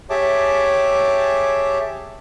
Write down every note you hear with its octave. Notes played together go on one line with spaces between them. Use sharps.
G4 G#4 C#5 E5 A5 D6